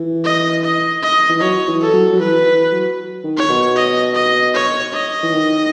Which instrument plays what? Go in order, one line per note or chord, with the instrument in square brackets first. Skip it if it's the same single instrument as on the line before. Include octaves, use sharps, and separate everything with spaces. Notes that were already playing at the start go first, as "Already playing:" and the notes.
Already playing: [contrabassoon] E3
[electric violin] D#5
D#5
D#5
[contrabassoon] E3
[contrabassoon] F#3 [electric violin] C#5
[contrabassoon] E3
[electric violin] A4
[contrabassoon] F#3
F#3
[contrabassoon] E3 [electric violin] B4
[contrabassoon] E3
F#3
D#3
[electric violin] C#5
[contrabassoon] B2
[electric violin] D#5
D#5
C#5
D#5
[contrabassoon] E3
D#3